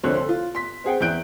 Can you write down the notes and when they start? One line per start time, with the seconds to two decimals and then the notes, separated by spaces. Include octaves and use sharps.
0.03 C2 D3 F3 C4 C#5 F#6
0.17 A4 C6
0.29 F4
0.55 C6 B6
0.84 C4 G#4 F#5 G5
1.01 E2 E4 F#6 G6 D7